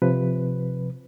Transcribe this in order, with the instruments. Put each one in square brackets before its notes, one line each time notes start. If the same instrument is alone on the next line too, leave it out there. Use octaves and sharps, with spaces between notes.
[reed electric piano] C3 F3 B4